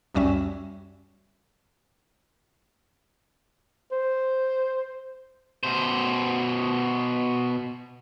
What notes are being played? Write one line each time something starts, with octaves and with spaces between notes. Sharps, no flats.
C#2 F#2 G3 C#4 E5
C5
B2 C5